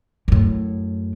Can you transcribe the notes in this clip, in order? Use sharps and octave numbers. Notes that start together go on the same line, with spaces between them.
F#2 A2